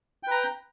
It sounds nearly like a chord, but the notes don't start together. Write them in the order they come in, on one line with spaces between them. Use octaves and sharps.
G5 B4 A#5